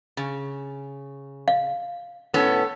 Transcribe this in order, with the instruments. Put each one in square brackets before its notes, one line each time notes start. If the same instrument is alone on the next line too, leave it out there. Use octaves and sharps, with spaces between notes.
[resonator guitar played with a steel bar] C#3
[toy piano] F5
[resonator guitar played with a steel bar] A2 B3 C#4 [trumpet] A4